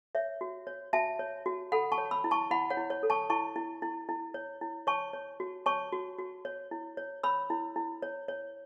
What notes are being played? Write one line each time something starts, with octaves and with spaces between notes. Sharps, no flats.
C#5 E5
F#4
C#5
F#4 E5 A5
C#5
F#4
A4 F#5 B5
A5 C#6
C#5
B5 E6
E4
A5 C#6
E4 F#5 B5
C#5 F#5
E4
C#5
A4
A5 C#6
E4 A5 C#6
E4
E4
E4
C#5
E4
C#5 A5 C#6
C#5
F#4
C#5 A5 C#6
F#4
F#4
C#5
E4
C#5
C#5 B5 E6
E4
E4
C#5
C#5